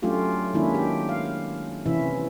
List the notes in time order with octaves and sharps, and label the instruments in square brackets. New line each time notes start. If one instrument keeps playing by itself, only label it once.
[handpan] F#3 A3 C#4 D4 F4 G4
D#3 G#3 A#3 C#4 D4 E4
D4 G4
F5
C3 E3 C#4 E4 E5